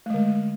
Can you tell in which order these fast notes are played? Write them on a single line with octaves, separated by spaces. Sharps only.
A3 G#3 D3